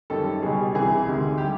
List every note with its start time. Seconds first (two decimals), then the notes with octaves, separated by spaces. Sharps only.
0.10 F#2 D#3 G3 A4
0.43 C#2 B2 G3 G#4
0.74 C2 C3 E3 G#4
1.06 D2 C3 D#3 G#3
1.38 D3 G3 G4